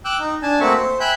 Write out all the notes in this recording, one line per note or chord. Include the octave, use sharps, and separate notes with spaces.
G5 D6 E6 F#6
D#4
D4 G#5 A5
A3 A#3 C4 F#4 E5 C#6
C5
E5 G5 G#5 B5 F#6 G6